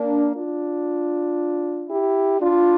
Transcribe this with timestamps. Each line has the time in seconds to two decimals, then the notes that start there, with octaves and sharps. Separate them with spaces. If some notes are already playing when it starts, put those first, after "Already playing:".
Already playing: A#3 D4
0.35 D4 F4
1.89 E4 G4
2.40 D4 F4